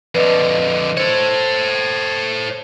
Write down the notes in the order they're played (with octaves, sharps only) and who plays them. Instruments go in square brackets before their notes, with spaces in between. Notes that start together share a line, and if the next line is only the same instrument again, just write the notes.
[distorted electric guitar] F2 D3 [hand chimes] B4 D5 D#5
[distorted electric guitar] A4 C#5 [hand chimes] C5